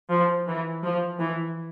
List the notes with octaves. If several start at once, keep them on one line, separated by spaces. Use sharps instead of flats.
F3
E3
F3
E3